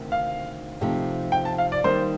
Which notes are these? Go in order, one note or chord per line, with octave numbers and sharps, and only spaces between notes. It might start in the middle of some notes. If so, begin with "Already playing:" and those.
Already playing: D2 C3 D#3
F5
C3 F3 A3 D#4 G4
G5
A5
F5
D5
D#3 G3 A#3 D#4 C5